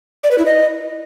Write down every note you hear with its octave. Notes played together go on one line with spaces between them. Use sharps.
D5
B4
E4
D#5